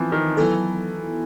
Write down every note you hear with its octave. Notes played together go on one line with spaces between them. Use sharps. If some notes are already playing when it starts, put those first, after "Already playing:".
Already playing: E3 F3 B3 C4
D#3
E3 F#3 B3 E4 A4